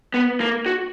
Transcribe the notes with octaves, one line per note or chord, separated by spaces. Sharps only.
B3
A#3
F#4